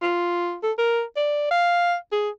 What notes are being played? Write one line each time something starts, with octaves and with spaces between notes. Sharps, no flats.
F4
A4
A#4
D5
F5
G#4